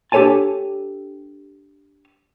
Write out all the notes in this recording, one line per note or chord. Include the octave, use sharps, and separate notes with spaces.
D4 G4 A4 C#5 G#5 A5